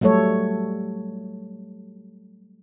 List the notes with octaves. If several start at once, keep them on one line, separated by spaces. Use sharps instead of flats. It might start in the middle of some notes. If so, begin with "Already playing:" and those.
F#3 G3 A3 A4 C#5